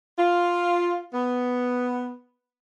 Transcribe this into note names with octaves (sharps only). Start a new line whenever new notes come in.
F4
B3